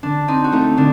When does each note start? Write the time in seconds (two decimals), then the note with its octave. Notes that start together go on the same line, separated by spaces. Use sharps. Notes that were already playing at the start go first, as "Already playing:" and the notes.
0.03 D3 D4
0.28 C4 D#4
0.44 F#4
0.52 A3 D#4
0.77 D3 D4